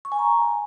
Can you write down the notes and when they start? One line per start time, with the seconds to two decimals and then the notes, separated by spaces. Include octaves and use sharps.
0.05 C#6
0.12 G#5
0.19 A#5